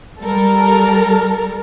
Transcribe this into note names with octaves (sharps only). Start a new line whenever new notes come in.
G3 A4 A#4